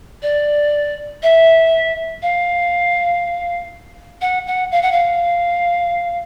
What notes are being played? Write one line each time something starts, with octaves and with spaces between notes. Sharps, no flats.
D5
E5
F5
F#5
F#5
F5
F#5
F5